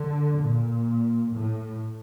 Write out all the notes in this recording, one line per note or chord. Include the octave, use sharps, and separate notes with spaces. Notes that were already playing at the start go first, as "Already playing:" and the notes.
Already playing: D3
A#2
A2